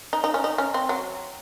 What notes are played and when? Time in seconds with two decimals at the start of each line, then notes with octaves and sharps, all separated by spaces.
0.13 D#4
0.24 D#4
0.34 C#4
0.44 D#4
0.58 C#4
0.74 C4
0.89 F#3